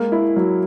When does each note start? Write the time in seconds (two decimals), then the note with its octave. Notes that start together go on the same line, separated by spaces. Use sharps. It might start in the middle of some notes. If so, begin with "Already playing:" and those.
Already playing: G#3 A#3
0.12 E4
0.36 F#3